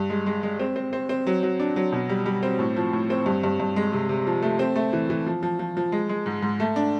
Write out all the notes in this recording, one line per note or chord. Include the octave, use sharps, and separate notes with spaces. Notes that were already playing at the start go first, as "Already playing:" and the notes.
Already playing: G2
G#3
G#3
G#3
C4
C4
C4
C4
F#3
F#3
D4
F#3
B2
G3
G3
C4
A2
F3
A2
C4
G2
G2
G2
G#3
C3
C3
F3
A3
C4
A3
E3
E3
F3
F3
F3
F3
G#3
G#3
G#2
G#2
A3
D4